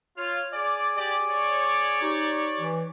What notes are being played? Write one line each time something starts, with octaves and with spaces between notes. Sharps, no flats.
F4 C#5 F6
G#4 D5 G#5 D6
G4 D5
C#5 D5
D#4 G4
E3